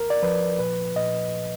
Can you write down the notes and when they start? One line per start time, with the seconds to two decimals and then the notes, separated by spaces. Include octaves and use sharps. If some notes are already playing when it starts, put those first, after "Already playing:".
Already playing: D#2 A#4
0.10 D5
0.22 F3 B4
0.59 A#2 B4
0.96 A#2 D#5